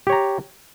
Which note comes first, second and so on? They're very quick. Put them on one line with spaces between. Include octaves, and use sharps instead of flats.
G4 C#5 A#5